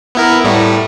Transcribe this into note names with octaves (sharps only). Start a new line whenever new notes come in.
B3 E4 A#4
A2 G3 A3